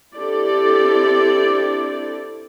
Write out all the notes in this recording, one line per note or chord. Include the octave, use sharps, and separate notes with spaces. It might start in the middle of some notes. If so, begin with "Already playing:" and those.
C4 D4 E4 G4 A4 D5